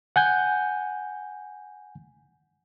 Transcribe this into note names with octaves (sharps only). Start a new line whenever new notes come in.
F#5 G#5 G6